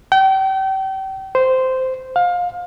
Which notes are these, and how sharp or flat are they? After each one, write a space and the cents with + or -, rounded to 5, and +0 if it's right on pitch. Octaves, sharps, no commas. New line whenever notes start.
G5 -35
C5 -10
F5 +25